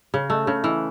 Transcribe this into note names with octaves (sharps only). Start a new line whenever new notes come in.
C#3
A3
C#3
E3